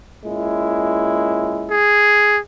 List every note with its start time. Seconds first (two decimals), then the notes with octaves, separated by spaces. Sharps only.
0.22 A#2 G#3 C#4 E4
1.70 G#4